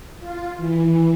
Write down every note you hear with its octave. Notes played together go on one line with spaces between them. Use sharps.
F4
E3